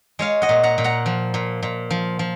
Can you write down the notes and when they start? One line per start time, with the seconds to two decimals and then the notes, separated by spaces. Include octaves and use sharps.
0.19 G#3 C#5 F5
0.42 D#5 F#5
0.49 A#2
0.63 F#5 A#5
0.78 A#2
0.84 F#5 A#5
1.06 F3
1.34 A#2
1.63 A#2
1.91 F3
2.19 F3